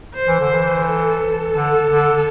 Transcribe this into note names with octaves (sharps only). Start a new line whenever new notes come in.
C5
E3
D3
E3
A4
D3
D3